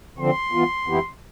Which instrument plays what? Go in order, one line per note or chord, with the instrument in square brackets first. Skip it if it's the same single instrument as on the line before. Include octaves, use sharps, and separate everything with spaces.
[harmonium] D3 F3 C4 [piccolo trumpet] C6
[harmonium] E3 B3 F4
F2 E3 B3 E4 G4